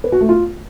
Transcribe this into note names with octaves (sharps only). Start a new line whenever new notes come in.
B4
F#4
A3
F4